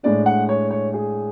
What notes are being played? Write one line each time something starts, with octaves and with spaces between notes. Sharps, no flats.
A2 G#3 D4 D5
F#5
C#5
C#5
G#4